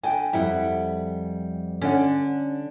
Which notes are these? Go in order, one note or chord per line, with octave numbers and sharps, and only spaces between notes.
D3 G5 G#5
F2 G3 E4 F#5
D3 C#4 D4 F#5